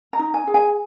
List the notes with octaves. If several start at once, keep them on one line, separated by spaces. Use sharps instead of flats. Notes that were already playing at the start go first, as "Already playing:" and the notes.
A#5
D#4
G#5
G#4
G#5